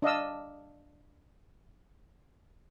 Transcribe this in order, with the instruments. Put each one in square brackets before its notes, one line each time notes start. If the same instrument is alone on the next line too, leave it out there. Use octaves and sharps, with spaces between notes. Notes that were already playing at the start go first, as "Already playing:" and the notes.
[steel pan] D4 D#5 F5 E6